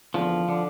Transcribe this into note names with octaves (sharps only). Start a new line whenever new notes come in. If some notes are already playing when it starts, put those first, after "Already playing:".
E2 D3 F3
D3